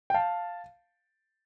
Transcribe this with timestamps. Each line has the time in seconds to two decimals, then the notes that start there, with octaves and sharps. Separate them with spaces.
0.10 G5
0.14 F5 A5